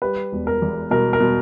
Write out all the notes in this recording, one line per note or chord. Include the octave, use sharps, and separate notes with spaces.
G3 B4
E1
A#4
E2
B2 A#4
A#4
B2